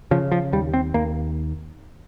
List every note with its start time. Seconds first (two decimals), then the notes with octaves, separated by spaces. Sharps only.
0.11 C#3 F3
0.32 F3
0.53 D#2 G3
0.74 C4
0.94 D#2 A#3